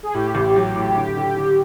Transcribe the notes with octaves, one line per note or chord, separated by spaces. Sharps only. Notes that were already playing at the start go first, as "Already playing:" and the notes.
G#4
A2 G4
A1
F#3
A2
D3
D3
D3